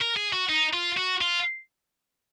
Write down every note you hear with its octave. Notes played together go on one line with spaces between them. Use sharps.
A#4
G#4
F#4
D#4
F4
F#4
F4